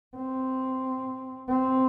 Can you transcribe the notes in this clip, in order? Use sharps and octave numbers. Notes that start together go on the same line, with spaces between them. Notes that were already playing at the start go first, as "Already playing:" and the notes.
C4
C4